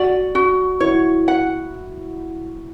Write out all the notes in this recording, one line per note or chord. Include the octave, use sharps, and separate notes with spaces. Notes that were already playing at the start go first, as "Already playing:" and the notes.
Already playing: F#4 D5
F#4
E4 C#5
F#5